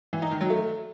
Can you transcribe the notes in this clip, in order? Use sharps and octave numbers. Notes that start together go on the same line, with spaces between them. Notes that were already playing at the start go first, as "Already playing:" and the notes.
E3
D#4
D#3
F#3
A3